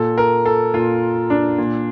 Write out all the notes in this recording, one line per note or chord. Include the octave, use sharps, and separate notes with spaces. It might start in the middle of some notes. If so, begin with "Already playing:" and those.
Already playing: A#2 A4
A#4
A4
A#2 F4
D4
A#2